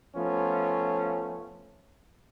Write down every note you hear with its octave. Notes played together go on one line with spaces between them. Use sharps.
F3 A3 B3 C#4 F4